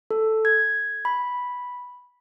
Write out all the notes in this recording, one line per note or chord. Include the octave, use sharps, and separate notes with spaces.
A4
G#6
B5